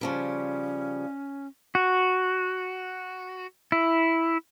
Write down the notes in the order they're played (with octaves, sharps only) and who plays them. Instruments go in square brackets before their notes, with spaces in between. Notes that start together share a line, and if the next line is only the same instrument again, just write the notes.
[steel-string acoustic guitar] C#3 F3 G3 [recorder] C#4
[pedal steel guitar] F#4
E4